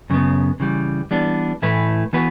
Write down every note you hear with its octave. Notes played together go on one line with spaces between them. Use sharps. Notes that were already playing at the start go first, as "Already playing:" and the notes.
F#2 C#3 B3
C#3 E3 G3
E3 G3 B3 D4
A2 E3 A3 E4 B4
E3 B3 F#4 B4